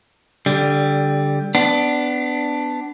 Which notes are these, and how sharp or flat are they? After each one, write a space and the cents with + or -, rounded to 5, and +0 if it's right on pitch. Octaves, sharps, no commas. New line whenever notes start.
D3 -15 G3 +0
B3 +25 D4 +0